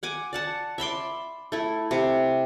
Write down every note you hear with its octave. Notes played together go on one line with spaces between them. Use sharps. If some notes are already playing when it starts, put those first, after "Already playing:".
F#5 G#5 D6
D5 F#5 A5
E5 B5 C6 D6
A3 E4
C3 D6